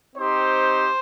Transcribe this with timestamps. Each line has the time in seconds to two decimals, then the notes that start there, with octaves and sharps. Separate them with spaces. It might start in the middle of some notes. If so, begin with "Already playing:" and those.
0.16 C4 D#4 G4 C5